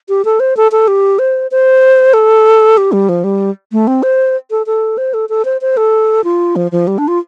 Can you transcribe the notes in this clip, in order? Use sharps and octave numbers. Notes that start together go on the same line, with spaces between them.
G4
A4
C5
A4
A4
G4
C5
C5
A4
G4
G3
F3
G3
A3
C4
C5
A4
A4
C5
A4
A4
C5
C5
A4
F4
F3
F3
G3
D4
F4